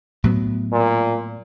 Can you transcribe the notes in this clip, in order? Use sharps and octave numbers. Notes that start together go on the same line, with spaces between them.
A2 F#3 B3
A#2